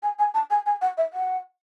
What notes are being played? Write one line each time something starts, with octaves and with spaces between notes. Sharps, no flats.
G#5
G#5
A5
G#5
G#5
F#5
E5
F#5